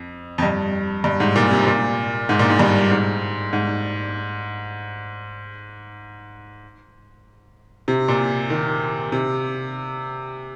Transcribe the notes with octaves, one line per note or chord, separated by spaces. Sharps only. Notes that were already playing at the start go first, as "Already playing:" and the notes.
Already playing: F2
F2
G2
G2
G#2
A#2
C3
A#2
G#2
A#2
G#2
G2
G#2
G#2
C3
A#2
D#3
C3